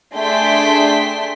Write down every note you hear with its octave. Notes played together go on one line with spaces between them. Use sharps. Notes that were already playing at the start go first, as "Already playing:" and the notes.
A3 D4 G#4 G5 C6 B6